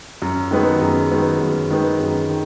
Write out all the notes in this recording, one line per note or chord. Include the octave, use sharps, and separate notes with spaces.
F#2
D#3 G#3 B3
F#2
D#3 G#3 B3
F#2
D#3 G#3 B3
F#2
D#3